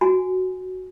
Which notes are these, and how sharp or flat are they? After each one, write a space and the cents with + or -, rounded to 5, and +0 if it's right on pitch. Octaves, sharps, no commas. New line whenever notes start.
F#4 +0 G#5 +0